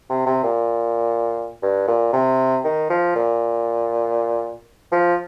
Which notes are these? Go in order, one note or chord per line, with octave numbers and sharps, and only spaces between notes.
C3
C3
A#2
G2
A#2
C3
D#3
F3
A#2
F3